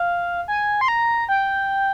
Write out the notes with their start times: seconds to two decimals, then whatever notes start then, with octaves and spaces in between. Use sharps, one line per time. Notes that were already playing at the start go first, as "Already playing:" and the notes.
Already playing: F5
0.48 G#5
0.81 C6
0.88 A#5
1.29 G5